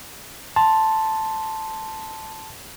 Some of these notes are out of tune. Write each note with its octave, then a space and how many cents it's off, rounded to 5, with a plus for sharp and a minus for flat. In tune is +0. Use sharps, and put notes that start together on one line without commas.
A5 +0 C6 +0